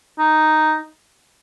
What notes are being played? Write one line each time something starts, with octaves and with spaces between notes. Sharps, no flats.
D#4